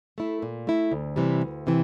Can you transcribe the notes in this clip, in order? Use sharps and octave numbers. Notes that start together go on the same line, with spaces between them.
A3 E4
A#2
A3 E4
D2
C3 E3 G3
D2
C3 E3